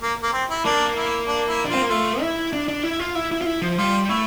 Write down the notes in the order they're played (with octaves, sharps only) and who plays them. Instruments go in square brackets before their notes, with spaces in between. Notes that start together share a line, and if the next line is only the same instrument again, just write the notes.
[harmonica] A#3
A#3
C4
E4
[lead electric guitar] A#3 [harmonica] D4
[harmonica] E4
D4
E4
[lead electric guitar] D4
[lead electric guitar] C4 [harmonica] F4
[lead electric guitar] A#3
[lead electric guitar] A3 [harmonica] F4
[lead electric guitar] E4
D4
D4
E4
F4
E4
E4
F4
E4
F3
[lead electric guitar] G3 [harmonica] F4
[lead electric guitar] A3 [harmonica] E4